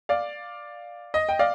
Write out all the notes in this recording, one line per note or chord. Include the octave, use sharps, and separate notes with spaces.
D5 F5
D#5
G5
D5 F5